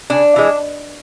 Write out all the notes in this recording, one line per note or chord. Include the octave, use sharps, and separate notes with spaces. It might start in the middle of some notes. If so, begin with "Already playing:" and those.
C#3 D4
E3 G#3